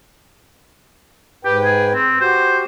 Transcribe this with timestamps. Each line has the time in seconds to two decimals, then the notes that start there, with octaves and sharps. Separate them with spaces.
1.45 G#2 G4 B4 G5
1.64 G#4
1.94 C4
2.20 F#4 G4 C5